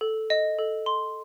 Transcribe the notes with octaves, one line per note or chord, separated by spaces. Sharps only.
A4
D#5
A4
C6